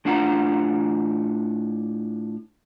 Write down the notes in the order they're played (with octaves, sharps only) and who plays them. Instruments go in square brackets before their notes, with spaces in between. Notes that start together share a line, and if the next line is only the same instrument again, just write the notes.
[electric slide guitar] A2 D4 F4 F#5 G#5 A#5